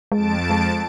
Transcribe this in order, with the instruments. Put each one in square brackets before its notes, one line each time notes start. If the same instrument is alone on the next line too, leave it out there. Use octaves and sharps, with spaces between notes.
[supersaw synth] F2 A5 D7 [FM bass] G#3
[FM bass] G#3